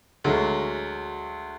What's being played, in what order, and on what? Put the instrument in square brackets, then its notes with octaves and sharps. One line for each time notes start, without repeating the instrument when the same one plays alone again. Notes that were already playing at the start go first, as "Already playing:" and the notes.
[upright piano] D2 F#3 G#3